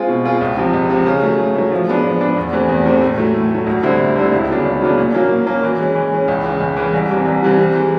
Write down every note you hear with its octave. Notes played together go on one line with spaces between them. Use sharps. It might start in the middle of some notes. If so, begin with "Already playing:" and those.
Already playing: G#3 C4 F4 G#4
B2
G#3 C4 F4 G#4
C#2
C3 F3
C#2
C3 F3
C#3
F#3 A3
C#3
F#3 A3
F3
G#3 B3 D4
F3
G#3 B3 D4
E2
C3 E3 A3 C4
E2
C3 E3 A3 C4
A2
F#3 A3
A2
F#3 A3
D2
D3 G3 C4 E4
D2
D3 G3 C4 E4
C#2
C#3 F#3 B3 D4
C#2
C#3 F#3 B3 D4
A#2
F#3 A#3 C#4
A#2
F#3 A#3 C#4
E3
G#3 C#4
E3
G#3 C#4
C#2
C#3 E3
C#2
C#3 E3
C2
C3 E3 G3
C2
C3 E3 G3
C3
E3 G#3